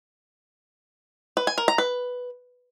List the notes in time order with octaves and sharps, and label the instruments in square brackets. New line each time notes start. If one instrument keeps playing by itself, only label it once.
[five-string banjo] B4
G#5
A#4
A#5
B4